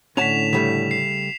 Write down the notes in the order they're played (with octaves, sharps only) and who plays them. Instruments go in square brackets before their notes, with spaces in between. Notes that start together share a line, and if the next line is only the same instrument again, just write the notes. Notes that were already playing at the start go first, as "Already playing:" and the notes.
[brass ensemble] A2 D3 [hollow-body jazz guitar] C#4 F#5 A5 [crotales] B6 E7 F7
[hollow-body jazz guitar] C#3 G3 A3 [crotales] B6
[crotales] C7